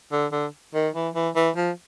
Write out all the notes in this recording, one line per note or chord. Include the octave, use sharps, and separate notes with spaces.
D3
D3
D#3
E3
E3
E3
F3